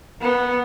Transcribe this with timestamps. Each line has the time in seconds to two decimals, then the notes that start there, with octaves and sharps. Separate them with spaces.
0.22 B3